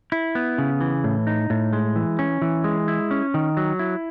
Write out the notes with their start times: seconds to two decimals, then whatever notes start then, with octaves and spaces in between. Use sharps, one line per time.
0.12 E4
0.35 B3
0.58 C#3
0.81 E3
1.04 A2
1.27 D#4
1.50 A2
1.73 G#3
1.96 E3
2.19 C#4
2.42 E3
2.64 G#3
2.88 E4
3.11 C#4
3.34 D#3
3.57 F#3
3.79 E4